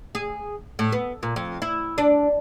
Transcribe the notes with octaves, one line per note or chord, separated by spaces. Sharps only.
G#4
A2
B3
A#2
F2
E4
D4